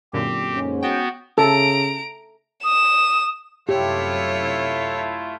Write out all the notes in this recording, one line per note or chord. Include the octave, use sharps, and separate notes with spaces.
F#2 A#2 D3 C4 G4
G#2 C#4
B3 F#4 G5
C#3 A4 A#5 D7
D#6 E7
F#2 C3 A3 E4 F4 G4 C#5